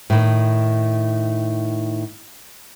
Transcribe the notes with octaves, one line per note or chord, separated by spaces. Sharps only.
A2 D#3